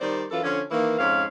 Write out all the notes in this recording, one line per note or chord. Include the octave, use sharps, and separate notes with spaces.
D#3 G3 C5 D5
F#2 E3 F4 A4
D3 F3 C#4
D#3 E3 A#3
F2 G#2 C#4 F5